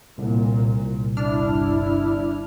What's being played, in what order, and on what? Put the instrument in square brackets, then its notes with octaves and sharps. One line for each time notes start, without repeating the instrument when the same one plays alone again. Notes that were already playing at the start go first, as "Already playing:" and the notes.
[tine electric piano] C2 [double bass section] A#2
[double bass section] G1 [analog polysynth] D4 F6 [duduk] E4